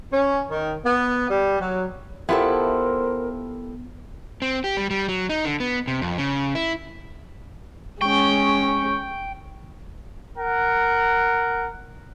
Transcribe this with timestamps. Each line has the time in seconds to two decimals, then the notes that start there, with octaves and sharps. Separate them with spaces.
0.12 C#4
0.50 D#3
0.84 B3
1.30 G3
1.60 F#3
2.29 B3 E4 F4 G4 A4 A#4 C5
4.42 C4
4.64 G4
4.77 G3
4.90 G3
5.09 F#3
5.30 D#4
5.45 D3
5.60 B3
5.88 C3
6.02 F2
6.18 C#3
6.55 E4
8.01 G#3 C#4 G5 C#6
10.38 A#4 F#5